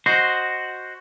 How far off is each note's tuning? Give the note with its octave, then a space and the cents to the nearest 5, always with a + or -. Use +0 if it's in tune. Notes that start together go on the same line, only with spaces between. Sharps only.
F#4 +0 C5 +0 D#5 +0